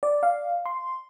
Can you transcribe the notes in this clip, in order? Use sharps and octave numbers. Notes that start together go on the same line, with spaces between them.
D5
F5
C6